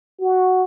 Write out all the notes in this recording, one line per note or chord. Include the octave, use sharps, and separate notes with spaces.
F#4